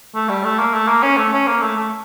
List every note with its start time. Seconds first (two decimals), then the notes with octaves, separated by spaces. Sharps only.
0.15 A3
0.29 G3
0.44 A3
0.59 A#3
0.74 A3
0.88 A#3
1.03 C#4
1.17 A3
1.33 C#4
1.48 A#3
1.62 A3
1.77 A3